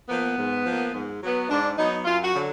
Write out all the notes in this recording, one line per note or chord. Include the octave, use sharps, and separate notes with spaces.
F3 A#3 B3
G#2
F3 A#3
G#2
F#3 B3
G#2 D4
F#3 B3 D#4
F#2 F4
F#4
D3 F#3